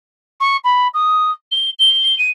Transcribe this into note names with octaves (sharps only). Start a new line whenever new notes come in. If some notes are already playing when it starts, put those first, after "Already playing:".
C#6
B5
D#6
G7
G7
D#7